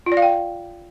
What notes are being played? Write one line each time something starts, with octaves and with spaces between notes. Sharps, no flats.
F4
D5
F5
G5